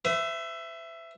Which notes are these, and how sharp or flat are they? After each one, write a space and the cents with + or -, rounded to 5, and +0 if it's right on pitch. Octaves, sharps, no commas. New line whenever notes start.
C5 -45 E5 +10